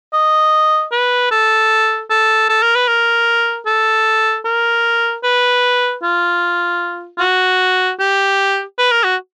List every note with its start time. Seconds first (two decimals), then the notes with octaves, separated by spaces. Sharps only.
0.13 D#5
0.92 B4
1.31 A4
2.10 A4
2.49 A4
2.63 A#4
2.75 B4
2.88 A#4
3.67 A4
4.45 A#4
5.24 B4
6.03 F4
7.17 F4
7.20 F#4
8.00 G4
8.78 B4
8.91 A#4
9.04 F#4